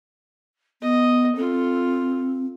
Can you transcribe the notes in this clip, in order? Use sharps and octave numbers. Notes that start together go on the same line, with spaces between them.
B3 D#5
C4 F4 A4